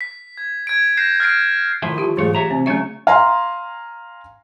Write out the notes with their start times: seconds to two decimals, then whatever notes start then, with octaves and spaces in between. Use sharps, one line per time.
0.01 B6
0.37 G#6
0.67 G#6 D7
0.97 F#6 G6 A#6 C7 E7
1.20 F6 A6 C7 D7
1.82 D#3 F3 A3 E4
1.98 F4 G4
2.17 B1 G#2 E3 A3 G#4 C#5
2.35 G4 C#5 E5 A#5
2.51 C3 C4
2.66 C#3 F#3 A3 C#4 C#5 E5
3.07 F5 G#5 A#5 C6